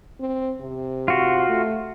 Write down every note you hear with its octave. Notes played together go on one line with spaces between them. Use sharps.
C4
C3
F4 F#4
A3